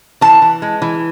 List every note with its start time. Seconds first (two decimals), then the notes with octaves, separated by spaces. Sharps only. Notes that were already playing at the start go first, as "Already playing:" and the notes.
0.21 E3 A5
0.42 E3
0.62 G#3
0.82 E3